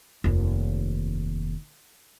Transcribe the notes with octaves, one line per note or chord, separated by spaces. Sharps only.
F1 D#2